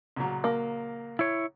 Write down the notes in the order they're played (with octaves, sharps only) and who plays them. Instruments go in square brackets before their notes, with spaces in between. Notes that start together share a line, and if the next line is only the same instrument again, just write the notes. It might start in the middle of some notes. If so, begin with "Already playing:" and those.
[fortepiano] C#2 A#2 F#3
[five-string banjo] A#3
[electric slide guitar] E4 C#5